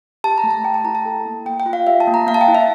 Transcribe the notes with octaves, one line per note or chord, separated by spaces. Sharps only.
G4 A5
A#5
A3
A5
A3 G5
A5
E4 A#5
A5
A4
A#3
A#3 G5
G5
F4
F5
G4 E5
A5
A#3
A#5
A#3 F5
A5
G5
E4
E5